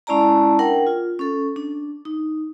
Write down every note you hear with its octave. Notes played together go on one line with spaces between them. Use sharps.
G#3 C#4 E4 D5 A5 A#5
D4 A#4 F#5 G5
F4
C#4 A4
D4
D#4